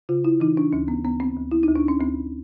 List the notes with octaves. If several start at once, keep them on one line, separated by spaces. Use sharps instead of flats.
C#3 F4
E4
E3 D#4
D4
D2 C#4
B3
D2 B3
C4
D2
E4
D#4
D2
D4
C#4
D2 C4